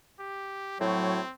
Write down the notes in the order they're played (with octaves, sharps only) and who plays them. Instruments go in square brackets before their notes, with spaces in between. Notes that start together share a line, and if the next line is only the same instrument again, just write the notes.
[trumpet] G4
[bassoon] A2 [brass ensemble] F#3 C#5 [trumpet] C4